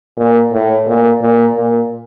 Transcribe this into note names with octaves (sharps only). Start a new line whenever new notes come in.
A#2
A2
A#2
A#2
A#2